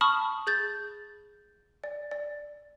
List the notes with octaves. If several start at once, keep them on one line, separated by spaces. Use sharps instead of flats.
A5 B5 C#6 D#6 F6
G#4 G6 A6
D5
D5